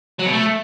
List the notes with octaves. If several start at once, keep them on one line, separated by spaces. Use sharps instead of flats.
F#3
B2
A3